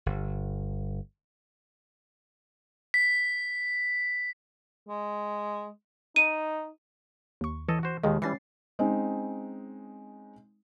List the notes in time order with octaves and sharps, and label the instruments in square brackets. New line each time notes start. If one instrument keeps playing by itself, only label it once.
[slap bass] G1
[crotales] B6
[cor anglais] G#3
[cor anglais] D#4 [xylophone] D#7
[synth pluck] D#2 C#6
[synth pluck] E3 [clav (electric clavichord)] A4 C#5 D#5
[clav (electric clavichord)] F#4 C5
[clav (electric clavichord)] D#2 A#2 D#3 [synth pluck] G#3 G#4
[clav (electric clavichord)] E3 G3 [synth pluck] C#4 A6 C7
[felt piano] G#3 C4 C#4 D#4